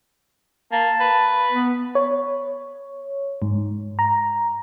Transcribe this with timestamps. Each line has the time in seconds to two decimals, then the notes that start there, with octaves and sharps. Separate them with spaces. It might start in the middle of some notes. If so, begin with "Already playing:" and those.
0.72 A#3 A5
1.00 B4
1.51 B3
1.95 C#5
3.42 G#2
3.99 A#5